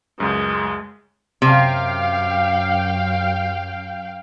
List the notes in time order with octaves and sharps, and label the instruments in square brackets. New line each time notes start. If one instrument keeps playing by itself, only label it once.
[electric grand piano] C#2 F#2 [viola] G#3
[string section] F#2 F5 G5 [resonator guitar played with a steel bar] C3